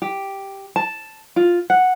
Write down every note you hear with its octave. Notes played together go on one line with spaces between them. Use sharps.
G4
A5
F4
F#5